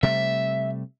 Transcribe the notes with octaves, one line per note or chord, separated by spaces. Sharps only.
C3 G3 A3 E5